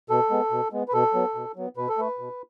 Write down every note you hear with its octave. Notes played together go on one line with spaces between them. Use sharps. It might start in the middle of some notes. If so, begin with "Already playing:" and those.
B2 A4
G#3 B3
B2
G#3 B3
B4
B2 A4
F#3 B3
B2
F#3 B3
B2 B4
A4
A3 B4
B2